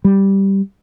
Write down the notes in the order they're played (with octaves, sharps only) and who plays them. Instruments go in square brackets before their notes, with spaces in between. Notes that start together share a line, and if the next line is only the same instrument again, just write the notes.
[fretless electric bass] G3